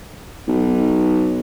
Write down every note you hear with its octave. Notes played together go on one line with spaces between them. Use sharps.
B1